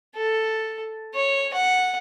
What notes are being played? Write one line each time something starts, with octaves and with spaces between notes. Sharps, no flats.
A4
C#5
F#5